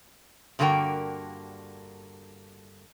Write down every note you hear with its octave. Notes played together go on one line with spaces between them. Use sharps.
G2 D3 A#3 F#4 A#4 G5